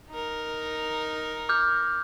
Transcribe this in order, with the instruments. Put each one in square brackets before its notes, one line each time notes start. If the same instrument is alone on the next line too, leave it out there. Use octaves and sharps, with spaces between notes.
[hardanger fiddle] D#4 A#4
[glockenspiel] D6 F6 G6